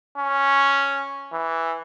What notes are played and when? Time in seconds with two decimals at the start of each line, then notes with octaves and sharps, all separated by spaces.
0.18 C#4
1.33 E3